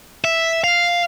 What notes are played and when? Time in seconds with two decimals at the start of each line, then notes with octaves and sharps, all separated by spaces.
0.24 E5
0.64 F5